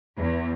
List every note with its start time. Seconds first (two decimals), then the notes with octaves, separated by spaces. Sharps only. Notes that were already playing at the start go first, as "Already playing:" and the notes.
0.16 E2